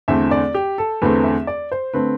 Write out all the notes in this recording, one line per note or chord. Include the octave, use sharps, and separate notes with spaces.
E2 D3 A3 C4 E5
D5
G4
A4
E2 D3 A3 C4 B4
E5
D5
C5
D3 A3 C4 B4